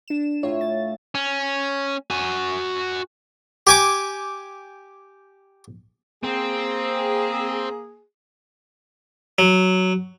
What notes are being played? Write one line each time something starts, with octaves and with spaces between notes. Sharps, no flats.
D4 E7
A2 F4 C#5 F5
A6
C#4
F#4 G#5
G4 G#5 D6
A#3 C4 G#4
F#3